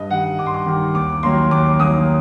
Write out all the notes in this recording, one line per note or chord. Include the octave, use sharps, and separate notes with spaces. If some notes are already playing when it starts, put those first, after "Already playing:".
Already playing: G2 D#5
D#3 G3 F#5
G2 D6
C6
D6
D#3 G3
D#2 D6
D#3 F#3 A#3 C6
D#2 D6
D#3 F#3 A#3 D#6